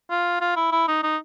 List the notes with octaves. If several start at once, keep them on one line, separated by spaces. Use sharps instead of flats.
F4
F4
E4
E4
D#4
D#4